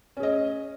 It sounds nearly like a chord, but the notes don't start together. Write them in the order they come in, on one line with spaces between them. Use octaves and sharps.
C#4 G#4 D#5